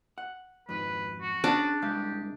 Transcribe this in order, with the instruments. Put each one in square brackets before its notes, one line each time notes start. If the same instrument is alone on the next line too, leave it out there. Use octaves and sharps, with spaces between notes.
[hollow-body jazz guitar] F#5
[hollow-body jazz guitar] F2 G#2 [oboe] B4
[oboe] F#4
[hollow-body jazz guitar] C#4 G#4 [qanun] D4
[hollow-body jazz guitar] C2 G#3 F5 [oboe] G4